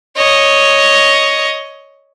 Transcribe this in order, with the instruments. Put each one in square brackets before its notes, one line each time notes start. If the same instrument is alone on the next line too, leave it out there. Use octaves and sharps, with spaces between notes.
[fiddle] C#5 D#5